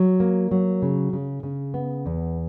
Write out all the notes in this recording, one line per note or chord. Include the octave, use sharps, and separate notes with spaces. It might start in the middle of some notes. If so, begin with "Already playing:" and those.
Already playing: F#3
A#3
F#3
C#3
C#3
C#3
B3
E2